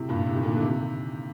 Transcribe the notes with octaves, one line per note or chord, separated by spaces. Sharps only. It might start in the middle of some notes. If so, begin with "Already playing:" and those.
Already playing: A2 C3
G2 A#2
A2 C3
D#3
A#2 D3
D3
C3 D#3